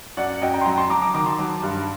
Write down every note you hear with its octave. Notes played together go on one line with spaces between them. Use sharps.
F#2 D5 F#5
F#2 D#5 G5
G5 A#5
C6
F#3 G5 A#5
A5 C6
F#3 A#5 D6
A#5 D6
D#3 A#5 D6
A5 C6
F#3
G2